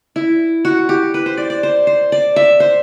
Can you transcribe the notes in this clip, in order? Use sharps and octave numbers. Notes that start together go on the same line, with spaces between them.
E4
F#4
G4
B4
C5
D5
D5
C5
C5
D5
E5
C5